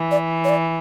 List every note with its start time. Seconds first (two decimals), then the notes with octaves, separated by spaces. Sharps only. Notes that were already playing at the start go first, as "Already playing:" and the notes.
Already playing: E3
0.11 D5
0.44 C#5
0.49 D5